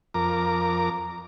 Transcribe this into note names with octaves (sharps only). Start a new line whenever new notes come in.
F2 A#4 A#5 D6